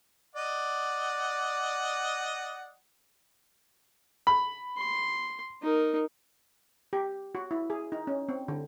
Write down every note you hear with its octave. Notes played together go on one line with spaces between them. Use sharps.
D5 D#5 F#5
B5
C6
D#4 A#4
G4
F#4
E4
G#4
D#4
C#4
C4
D3